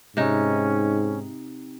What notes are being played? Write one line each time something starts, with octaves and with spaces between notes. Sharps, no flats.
G#2 C3 C#4 D#4